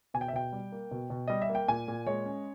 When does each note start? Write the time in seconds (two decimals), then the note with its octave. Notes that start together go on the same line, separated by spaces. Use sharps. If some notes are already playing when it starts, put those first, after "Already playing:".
0.14 B2 G#5
0.21 G5
0.28 E5
0.33 B2 G5
0.53 G3
0.72 A#3
0.91 B2
1.10 B2
1.28 G3 D#5
1.42 E5
1.49 A#3
1.55 G5
1.68 A#2 G#5
1.88 A#2
2.07 G#3 C#5
2.26 C#4